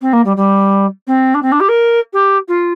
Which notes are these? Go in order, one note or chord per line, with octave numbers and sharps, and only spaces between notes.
C4
A#3
G3
G3
C4
D4
C4
D4
G4
A#4
G4
F4